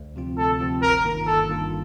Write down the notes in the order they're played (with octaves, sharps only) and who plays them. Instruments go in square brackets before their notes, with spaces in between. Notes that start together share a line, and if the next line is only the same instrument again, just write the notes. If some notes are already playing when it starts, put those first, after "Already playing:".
Already playing: [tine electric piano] D2
C3 F3 C4 F4
[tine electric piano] D2 [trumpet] A4
[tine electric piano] C3 F3 C4 F4
[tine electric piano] G1 [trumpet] A#4
[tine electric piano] G2 D#3 A#3 F4
[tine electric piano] G1 [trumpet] A4
[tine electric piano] G2 D#3 A#3 F4